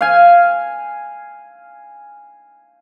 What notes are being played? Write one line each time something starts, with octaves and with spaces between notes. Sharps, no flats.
F5 G#5